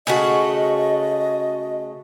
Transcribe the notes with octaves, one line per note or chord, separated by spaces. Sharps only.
C#3 A3 F#4 D#5